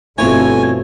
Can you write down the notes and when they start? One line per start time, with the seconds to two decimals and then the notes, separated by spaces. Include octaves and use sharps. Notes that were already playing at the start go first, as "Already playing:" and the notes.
0.18 G1 F2 B2 A3 E4 C#5 G#5